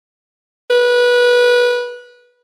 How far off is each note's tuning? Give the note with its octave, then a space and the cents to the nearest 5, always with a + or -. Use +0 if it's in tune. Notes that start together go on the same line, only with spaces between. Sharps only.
B4 -20